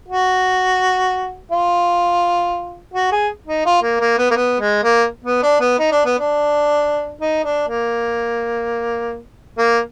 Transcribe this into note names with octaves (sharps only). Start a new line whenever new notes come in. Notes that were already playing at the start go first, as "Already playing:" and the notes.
F#4
F4
F#4
G#4
D#4
F4
A#3
A#3
B3
A#3
B3
G#3
A#3
B3
D4
B3
D#4
D4
B3
D4
D#4
D4
A#3
A#3